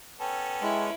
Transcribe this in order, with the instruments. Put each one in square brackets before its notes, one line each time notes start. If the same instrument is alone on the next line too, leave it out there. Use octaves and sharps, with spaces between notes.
[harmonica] B3 C#4 A4 [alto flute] G5
[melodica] G#3 [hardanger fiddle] E4